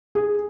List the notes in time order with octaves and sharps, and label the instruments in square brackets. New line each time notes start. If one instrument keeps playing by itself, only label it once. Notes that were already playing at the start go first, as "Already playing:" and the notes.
[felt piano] G#4